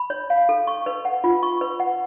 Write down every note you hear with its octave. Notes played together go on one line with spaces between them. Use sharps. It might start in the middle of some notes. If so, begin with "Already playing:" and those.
Already playing: B5
C#5
F5
A4
C#6
B4
F#5
F4
C#6
B4
F#5